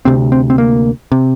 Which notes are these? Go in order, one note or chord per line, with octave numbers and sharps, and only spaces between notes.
D2 C3 C4
C4
C4
A#3
C3